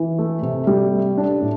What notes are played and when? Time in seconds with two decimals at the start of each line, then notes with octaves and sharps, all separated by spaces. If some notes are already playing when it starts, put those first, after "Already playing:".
Already playing: E3
0.19 A3
0.42 C3
0.67 G3
0.93 A3
1.17 D4
1.41 A2